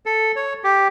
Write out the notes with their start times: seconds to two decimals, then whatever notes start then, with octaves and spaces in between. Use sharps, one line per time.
0.06 A4
0.36 C#5
0.64 G4